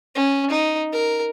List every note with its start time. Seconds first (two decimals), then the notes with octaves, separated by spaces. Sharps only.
0.15 C#4
0.50 D#4
0.93 A#4